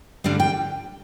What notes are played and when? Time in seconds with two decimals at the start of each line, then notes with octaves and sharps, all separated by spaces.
0.24 G2 D3 G3 D4 F5
0.40 G5